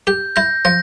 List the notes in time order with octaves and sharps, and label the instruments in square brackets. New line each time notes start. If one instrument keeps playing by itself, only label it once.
[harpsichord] G4 [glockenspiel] G6
[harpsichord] E4 [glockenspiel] G6 A#6
[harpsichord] F3 [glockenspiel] G6 A#6